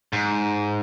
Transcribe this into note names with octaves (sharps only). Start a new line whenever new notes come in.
G#2